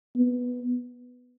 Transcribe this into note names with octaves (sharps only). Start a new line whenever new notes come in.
B3